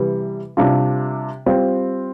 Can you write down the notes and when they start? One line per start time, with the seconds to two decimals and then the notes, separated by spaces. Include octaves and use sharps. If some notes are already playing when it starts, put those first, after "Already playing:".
Already playing: C3 E3 G3 B3
0.57 C3 G3 D4 F4
1.46 G3 C4 F4